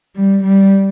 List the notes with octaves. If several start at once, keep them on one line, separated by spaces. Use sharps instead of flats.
G3
G3